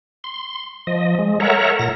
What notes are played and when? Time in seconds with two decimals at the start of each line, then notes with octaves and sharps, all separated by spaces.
0.24 C6
0.87 F3 D#5
1.19 G#3
1.40 A4 A#4 C#5 E5 F#5 A#5
1.79 A#2 A#6